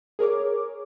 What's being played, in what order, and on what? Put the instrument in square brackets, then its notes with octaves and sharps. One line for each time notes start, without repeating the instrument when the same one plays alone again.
[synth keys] G#4 A#4 C#5 D6